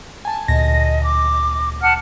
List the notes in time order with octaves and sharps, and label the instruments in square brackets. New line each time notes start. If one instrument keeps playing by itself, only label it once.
[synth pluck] G#5 A5
[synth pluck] D2 A#2 A#6 [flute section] D#5
[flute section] D6
F#5 A5 F6